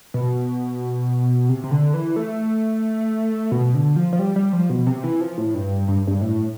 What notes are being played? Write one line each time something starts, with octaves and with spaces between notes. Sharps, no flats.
B2
C3
C3
D3
E3
A3
B2
D3
F3
F3
G3
G3
F3
B2
C3
E3
F3
A2
G2
G2
G2
A2